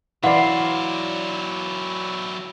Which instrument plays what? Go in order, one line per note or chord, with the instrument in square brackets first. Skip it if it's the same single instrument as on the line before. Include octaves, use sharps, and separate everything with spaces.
[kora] E3 [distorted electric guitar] F#3 E4 [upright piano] D5 F5 [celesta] F#5 C6 C7